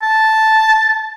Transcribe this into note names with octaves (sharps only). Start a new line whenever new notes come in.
A5